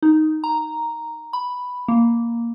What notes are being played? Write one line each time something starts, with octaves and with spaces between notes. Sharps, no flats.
D#4
A#5
B5
A#3